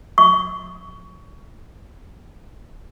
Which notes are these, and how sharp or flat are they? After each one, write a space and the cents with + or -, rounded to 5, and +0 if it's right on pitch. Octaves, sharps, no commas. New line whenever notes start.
C#6 +20